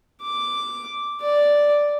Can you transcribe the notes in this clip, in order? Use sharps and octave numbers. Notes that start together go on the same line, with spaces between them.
D6
D5